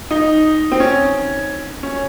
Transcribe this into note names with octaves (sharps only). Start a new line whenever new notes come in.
D#4
C4
C#4
C#4